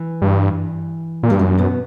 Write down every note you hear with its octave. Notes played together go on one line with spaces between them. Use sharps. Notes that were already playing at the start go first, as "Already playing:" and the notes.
Already playing: E3
G2
A#2
G2 G3
F#2 F#3
B2 B3